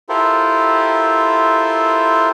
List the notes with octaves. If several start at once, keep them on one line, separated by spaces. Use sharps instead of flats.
E4 F4 G4 A4 A#4 C5